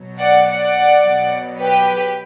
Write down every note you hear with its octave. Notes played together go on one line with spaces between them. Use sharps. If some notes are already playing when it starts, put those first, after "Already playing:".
Already playing: B2 F#3
D5 F#5
D5 F#5
B2 F#3
G4 B4